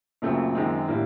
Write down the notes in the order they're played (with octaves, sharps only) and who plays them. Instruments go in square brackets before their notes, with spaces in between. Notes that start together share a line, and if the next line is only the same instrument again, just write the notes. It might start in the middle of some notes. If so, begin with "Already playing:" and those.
[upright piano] F#2 C#3 F#3 A3 C4 [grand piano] A#2
[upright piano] F#2 D#3 G#3 C4
[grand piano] A2 [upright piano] D3 G3 A#3